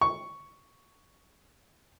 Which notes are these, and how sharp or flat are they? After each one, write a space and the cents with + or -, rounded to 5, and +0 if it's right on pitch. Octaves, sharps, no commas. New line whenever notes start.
C#6 +5